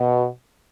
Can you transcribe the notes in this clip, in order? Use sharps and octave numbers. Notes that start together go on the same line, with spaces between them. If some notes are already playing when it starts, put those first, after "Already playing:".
Already playing: B2